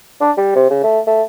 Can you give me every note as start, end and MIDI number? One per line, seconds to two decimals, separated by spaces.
0.21 0.31 62
0.37 0.55 55
0.56 0.70 48
0.70 0.79 49
0.84 0.99 57
1.07 1.23 57